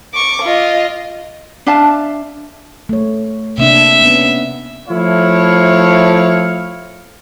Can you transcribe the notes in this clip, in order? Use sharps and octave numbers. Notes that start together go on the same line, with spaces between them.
C#6 D6
F4 D#5
D4 E5 F5 A5
A3 C#5
C3 A#3 D4 E5
B3 C#4
F3 A3 E4 C#5 F5